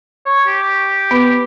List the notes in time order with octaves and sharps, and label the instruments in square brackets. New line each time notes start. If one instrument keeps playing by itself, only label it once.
[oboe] C#5
G4
[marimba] B3 B4